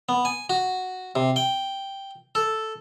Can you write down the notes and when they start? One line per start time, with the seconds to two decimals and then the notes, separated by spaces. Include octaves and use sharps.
0.09 B3
0.25 G#5
0.50 F#4
1.16 C3
1.36 G5
2.35 A4